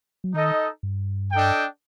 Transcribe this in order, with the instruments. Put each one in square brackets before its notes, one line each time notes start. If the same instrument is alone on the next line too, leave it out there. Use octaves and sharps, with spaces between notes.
[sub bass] F#3
[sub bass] D#3 [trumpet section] D#4 A4 D#5
[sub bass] G2
[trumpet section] D4 A4 D#5 G5